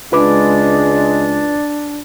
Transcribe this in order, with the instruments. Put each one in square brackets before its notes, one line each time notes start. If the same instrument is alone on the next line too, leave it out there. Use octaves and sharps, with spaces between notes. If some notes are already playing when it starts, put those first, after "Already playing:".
[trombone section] C#2 G#3 [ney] D4 [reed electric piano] F4 B4 D6